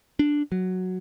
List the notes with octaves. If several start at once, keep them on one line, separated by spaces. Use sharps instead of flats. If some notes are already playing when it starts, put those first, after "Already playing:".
D4
F#3